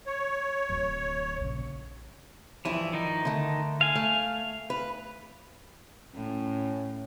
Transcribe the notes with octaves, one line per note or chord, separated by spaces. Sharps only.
C#5
D1 F#2
A#1 C#3
G2 E3 F3 E4
D#3 D#4
D3 A3
F5 G#5
A3
B4
A2 C#4